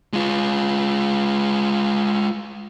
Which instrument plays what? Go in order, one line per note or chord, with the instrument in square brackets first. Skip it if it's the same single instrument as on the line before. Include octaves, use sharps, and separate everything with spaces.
[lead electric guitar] G#3 F4